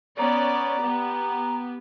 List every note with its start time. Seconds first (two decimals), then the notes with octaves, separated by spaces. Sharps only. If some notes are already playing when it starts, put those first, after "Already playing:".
0.19 B3 C#4 D5 A#5
0.83 B3 G4